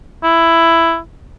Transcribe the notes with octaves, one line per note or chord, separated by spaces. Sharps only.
E4